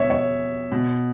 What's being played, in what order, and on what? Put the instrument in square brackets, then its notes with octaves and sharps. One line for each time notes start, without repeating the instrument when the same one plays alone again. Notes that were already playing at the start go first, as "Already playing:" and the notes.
Already playing: [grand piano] B2 C#5 E5
C#5
B2